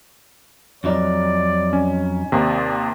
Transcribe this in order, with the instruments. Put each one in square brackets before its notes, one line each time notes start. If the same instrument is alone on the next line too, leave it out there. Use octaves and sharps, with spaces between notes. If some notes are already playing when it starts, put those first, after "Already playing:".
[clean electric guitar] F2 F#3 D#4 [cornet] D5
[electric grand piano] C#4
[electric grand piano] D#2 C3 [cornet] D5